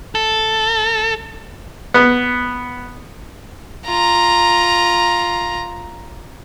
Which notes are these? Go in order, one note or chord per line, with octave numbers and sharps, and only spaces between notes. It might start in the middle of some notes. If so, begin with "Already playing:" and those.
A4
B3
F4 A#5